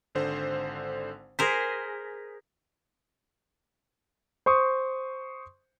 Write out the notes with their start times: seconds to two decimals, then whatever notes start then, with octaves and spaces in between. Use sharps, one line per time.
0.15 G#1 D3 C5
1.39 G#4 A#4 C5 A#6 B6
4.46 C5 C6 C#6 D#6